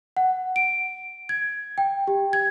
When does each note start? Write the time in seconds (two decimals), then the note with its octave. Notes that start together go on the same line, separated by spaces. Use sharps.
0.17 F#5
0.56 D7
1.29 G#6
1.78 G5
2.07 G4
2.33 G#6